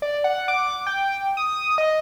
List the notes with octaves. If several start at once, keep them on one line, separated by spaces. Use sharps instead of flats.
D5
F#5
D6
G5
D#6
D#5